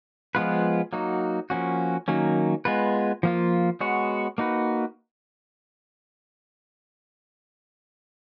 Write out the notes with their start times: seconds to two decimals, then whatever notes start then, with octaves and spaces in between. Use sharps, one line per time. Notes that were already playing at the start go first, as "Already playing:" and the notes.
0.35 F3 G#3 B3 F4 B4
0.93 F#3 A#3 D#4 F#4
1.50 F3 A#3 C#4 F#4
2.08 D#3 F#3 A#3 C#4
2.65 G#3 B3 F4 B4
3.23 F3 A#3 F4
3.81 G#3 B3 F#4 C#5
4.38 A#3 D#4 F#4 B4